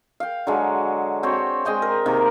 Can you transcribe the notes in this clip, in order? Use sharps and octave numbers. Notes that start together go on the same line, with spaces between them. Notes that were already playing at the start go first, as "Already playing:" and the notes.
F5 G5
D3 F#3 G#3
C4 F#4 C#5 G5
G#3 D#5 G5 C6
A#4
C3 D#3 A#3